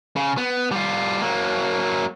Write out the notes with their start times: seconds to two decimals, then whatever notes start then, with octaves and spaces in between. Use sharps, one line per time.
0.16 C#3
0.38 B3
0.72 G3 F4
1.22 F#3 A#3